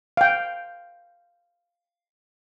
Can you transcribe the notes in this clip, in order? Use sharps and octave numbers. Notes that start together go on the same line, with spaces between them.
F5 G5